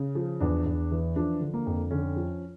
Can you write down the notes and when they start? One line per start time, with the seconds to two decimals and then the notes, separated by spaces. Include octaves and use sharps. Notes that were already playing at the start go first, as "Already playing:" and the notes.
Already playing: C#3
0.15 F3
0.40 E2 D4
0.65 E2
0.91 E3
1.16 F3 D4
1.41 D3
1.54 A#3
1.67 F2
1.91 D3 C#4
2.16 F3